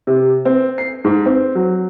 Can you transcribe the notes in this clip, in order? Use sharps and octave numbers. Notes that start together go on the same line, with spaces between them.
C3
C4
C7
G#2
C4
F#3